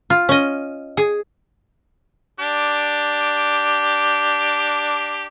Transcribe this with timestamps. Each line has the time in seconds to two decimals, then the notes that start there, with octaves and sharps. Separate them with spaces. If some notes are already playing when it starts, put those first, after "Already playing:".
0.10 F4
0.29 C#4 D#5
0.97 G#4
2.40 D4 G4